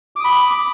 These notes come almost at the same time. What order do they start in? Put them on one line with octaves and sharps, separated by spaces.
D6 D#6 B5